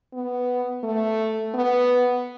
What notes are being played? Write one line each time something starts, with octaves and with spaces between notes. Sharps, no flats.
B3
A3
B3